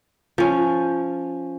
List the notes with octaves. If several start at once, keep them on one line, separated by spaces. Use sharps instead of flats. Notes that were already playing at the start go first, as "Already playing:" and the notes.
F3 C#4